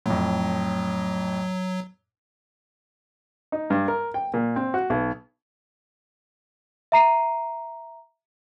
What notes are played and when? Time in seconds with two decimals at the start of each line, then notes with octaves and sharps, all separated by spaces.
0.06 F2 A2 F#3
3.52 D#4
3.70 G2
3.88 A#4
4.14 G5
4.34 A#2
4.56 C4
4.74 F#4
4.90 B1
6.92 E5 A#5 C7 D#7